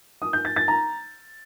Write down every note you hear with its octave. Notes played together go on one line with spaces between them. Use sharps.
D#6
G6
A6
A6
A#5